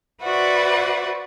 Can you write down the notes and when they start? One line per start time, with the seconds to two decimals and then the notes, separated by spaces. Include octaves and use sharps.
0.21 F#4 B4 C5 D5 E5 F#5